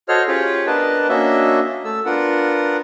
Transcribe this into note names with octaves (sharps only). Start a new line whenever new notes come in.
F#4 A4 C5 C#5 D#5 F6
C#4 F4 G4 G#4 C#5
B3 D4 A#4 B4 D#5 A5
A#3 C#4 D4 F#4 D#5 E5
A3 A4 E6
B3 D4 F4 A#4 F#5